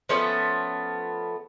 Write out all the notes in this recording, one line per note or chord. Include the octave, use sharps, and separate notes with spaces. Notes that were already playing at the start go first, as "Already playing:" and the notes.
F3 A3 B3 C#4